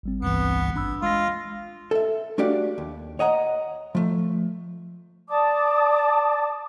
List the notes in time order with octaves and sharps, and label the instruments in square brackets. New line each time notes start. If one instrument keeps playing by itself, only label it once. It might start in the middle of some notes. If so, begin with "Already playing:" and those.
[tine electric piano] G#1 G3 C4
[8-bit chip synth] C#2 G2 E3 [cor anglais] B3
[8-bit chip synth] G#1 [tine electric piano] D4 B5 E6
[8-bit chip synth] G#3 A#6 [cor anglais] F4
[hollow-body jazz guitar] A4 E5
A3 D4 F#4 G4 D5 F5
D#2
C#5 D#5 F#5 A#5
F3 A3
[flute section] D5 A5 D6 D#6